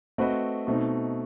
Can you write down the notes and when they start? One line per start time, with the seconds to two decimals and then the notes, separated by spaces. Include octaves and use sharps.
0.18 A3 C4 F#4 B4 D#5
0.67 B2 A3 C4 D#4